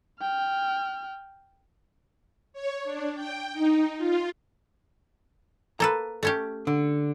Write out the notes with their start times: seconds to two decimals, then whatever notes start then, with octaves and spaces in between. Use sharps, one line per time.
0.21 G5 F6
2.53 C#5
2.84 D4
3.14 G5
3.52 D#4
3.97 F4
5.80 A#3 A4 B4 A#5
6.23 A3 C#4 G4
6.67 D3